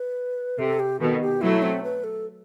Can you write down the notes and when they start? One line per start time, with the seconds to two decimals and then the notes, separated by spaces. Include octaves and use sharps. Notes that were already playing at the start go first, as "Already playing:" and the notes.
Already playing: B4
0.59 C3 A4
0.79 G4
1.00 B2 D#3 A4
1.21 G4
1.41 F#3 A3 E4
1.62 C4
1.83 B4
2.04 A4